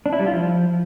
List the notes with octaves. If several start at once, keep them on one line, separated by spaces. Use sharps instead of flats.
D4
E4
G3
F4
F3